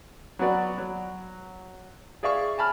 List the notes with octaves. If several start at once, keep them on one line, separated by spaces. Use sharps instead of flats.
F#3 B3 F#4 D5 F#5
F#3
G#4 D5 E5 F5 C#6
G#5 A5 B5 F6